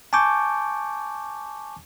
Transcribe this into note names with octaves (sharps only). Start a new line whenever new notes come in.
G#5 A5 C#6 D6 G6